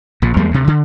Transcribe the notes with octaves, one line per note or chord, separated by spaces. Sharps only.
A#1 A#2
E2 G3 G#3 A#3
D2 C3
D3